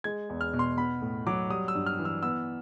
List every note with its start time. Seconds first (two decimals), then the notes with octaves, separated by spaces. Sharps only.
0.04 G#3 G#6
0.29 E2
0.41 F6
0.53 B2
0.59 C6
0.77 B3 B5
1.02 A2
1.27 F#3 D6
1.50 G3 D#6
1.68 E6
1.75 G2
1.86 F6
1.99 E3
2.05 E6
2.23 B3 E6